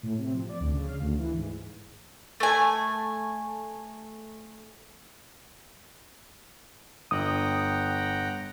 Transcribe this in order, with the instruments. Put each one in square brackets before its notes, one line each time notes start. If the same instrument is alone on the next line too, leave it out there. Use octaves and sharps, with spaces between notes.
[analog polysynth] A2
C3
F3
D5
D2
C#3
F5
D2
E3
G#2
[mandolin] A3 G#5
[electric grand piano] G1 [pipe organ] F#5 G5 A#5 [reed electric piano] D#6